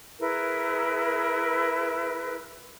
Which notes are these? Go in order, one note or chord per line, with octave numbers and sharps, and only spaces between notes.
E4 G#4 A#4 B4